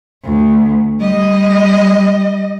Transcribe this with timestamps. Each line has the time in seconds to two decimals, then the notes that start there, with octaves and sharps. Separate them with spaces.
0.24 D2
0.99 G3 D#5